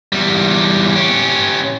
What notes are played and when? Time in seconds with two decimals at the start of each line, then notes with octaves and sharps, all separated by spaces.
0.12 E2 G3
0.95 C#4 G4